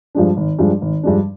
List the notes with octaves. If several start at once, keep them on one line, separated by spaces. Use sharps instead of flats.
G2 F3 G#3 D4
G#1
G2 F3 G#3 D4
G#1
G2 F3 G#3 D4